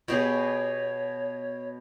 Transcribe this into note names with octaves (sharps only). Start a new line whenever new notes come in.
B2 G4 G#4 C#5